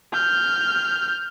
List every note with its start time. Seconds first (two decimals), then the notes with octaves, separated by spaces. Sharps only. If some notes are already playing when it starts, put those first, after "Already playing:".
0.13 F6 G6